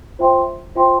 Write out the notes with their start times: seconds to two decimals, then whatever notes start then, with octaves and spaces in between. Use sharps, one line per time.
0.19 F4 C5 E5 G5 C6
0.75 F4 C5 E5 G5 C6